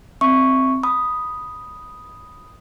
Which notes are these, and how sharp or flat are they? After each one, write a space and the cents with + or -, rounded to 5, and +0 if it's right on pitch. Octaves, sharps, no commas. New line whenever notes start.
C4 +0 E5 +0 C#6 +0
B5 +0 D#6 +0